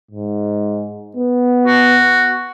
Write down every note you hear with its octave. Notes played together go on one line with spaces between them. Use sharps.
G#2
B3
F#4